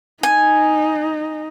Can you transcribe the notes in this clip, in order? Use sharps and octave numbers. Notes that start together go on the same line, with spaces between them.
D#4 G#5